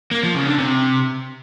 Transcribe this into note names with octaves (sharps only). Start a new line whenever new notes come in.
A#3
F3
C#3
D3
C3